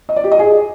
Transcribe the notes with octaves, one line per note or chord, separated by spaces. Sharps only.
D#5
D5
G4
D#5
G#4